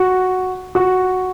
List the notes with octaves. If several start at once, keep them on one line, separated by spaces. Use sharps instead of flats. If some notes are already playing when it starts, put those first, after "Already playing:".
Already playing: F#4
F#4